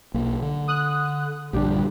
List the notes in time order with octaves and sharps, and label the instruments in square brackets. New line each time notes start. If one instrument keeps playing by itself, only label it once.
[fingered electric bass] B1 A#3
D3
[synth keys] D#6 F#6
[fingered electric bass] A#1 G2 D3 [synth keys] G3 D4 G4